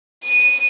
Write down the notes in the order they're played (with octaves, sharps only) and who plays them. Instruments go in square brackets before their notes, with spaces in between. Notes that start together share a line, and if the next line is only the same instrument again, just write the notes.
[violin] D#7